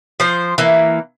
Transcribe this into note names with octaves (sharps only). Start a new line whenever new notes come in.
F3 C5
E3 A#3